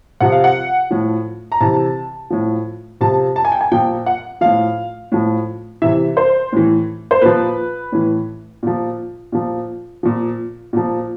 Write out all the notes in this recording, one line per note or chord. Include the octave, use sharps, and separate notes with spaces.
C3 F3 F#5
F5
F#5
A2 F3
A#5
C3 E3 A5
A2 F3
C3 F3 A5
A5
G#5
G5
G#5
A#2 F3 G5
F#5
A2 F3 F5
A2 F3
C3 E3 E5
C5
A2 E3
C5
A#2 F3 B4
A2 E3
A#2 F3
A#2 F3
A#2 F3
A#2 F3